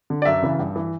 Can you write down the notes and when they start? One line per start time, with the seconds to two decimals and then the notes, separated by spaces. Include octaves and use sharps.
0.10 D3
0.22 D5
0.25 F#2 E5
0.42 C#3 E3
0.59 G2
0.76 E3